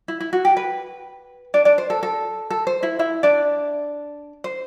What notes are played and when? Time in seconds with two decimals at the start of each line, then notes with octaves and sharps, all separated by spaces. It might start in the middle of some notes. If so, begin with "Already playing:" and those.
0.08 E4
0.20 E4
0.33 F#4
0.45 G4
0.57 B4
1.54 D4 D5
1.65 D4 D5
1.78 C5
1.90 A4
2.03 A4
2.50 A4
2.67 C5
2.83 E4 E5
2.99 E4 E5
3.23 D4 D5
4.44 C5